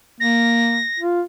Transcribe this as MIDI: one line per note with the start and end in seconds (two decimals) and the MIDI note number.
0.20 0.83 58
0.20 1.00 94
0.99 1.21 65